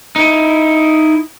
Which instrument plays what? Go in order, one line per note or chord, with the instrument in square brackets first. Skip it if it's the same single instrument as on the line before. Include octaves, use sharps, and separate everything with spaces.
[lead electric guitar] D#4 E4